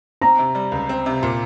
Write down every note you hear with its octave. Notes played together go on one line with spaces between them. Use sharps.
C4 A#5
C3
G3
C#2
C4
C3
A#2